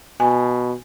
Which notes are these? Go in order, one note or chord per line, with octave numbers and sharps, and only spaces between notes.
B2 G#5